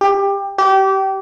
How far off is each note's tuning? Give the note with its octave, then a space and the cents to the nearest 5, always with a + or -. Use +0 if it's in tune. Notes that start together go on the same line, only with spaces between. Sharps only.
G4 +20
G4 -25